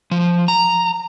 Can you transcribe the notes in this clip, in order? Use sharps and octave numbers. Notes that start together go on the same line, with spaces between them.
F3
A#5